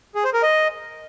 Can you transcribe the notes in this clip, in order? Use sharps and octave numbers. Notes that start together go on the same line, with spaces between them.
G#4
C5
A#4
D#5